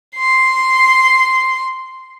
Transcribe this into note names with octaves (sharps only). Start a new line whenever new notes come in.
C6 C7